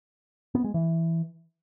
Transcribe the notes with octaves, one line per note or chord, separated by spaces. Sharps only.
B3
G#3
E3